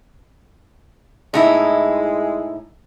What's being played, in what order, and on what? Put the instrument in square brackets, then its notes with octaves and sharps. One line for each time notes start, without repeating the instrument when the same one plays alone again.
[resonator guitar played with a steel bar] A2 D#4 E4 [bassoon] G#3